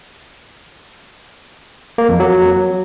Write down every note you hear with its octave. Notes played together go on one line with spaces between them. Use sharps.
A#3
F2
F#3